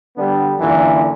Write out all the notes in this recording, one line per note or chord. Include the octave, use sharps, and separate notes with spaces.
D3 G3 B3 D4
F#2 A#2 D3 E3